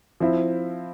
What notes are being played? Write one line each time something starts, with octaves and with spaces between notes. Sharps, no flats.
F3 C4 E4